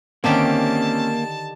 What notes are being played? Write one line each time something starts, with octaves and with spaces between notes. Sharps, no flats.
D3 D#3 A#3 C4 C#4 G4 A5